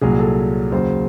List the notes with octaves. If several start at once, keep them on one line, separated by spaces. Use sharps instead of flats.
C2 A#2 F#3 G#4
A4
D#2 C#3 F#3 C5